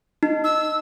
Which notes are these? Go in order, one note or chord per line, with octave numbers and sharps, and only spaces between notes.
D#4
E6